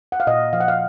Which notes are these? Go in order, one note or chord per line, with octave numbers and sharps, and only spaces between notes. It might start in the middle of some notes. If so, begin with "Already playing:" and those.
F#5
F5
A#2 D#5
F3 F5
F#5
F5